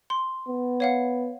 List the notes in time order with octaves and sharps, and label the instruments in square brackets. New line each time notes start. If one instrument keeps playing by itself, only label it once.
[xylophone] C6
[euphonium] B3
[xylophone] C#5 F5 F#5